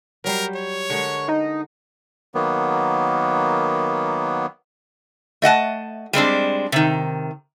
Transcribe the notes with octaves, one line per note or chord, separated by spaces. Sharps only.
F#3 G3 A#4 C5
C#5
D3 G#3 A#4 C#6
D#4
D#3 F#3 A#3 B3
A3 D#5 F#5 A5
G3 G#3 C4 D4
C3 D#3